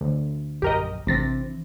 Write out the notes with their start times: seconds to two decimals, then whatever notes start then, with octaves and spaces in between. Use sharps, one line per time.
0.01 D2
0.62 A#1 F#2 G4 A#4 D#5
1.07 A1 C3 E3 C4 D4 A6 A#6